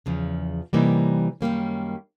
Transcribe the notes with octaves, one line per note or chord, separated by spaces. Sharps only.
E2 C#3 F3
C3 E3 G3 A#3 D#4
F#2 D#3 G3 A#3 C#4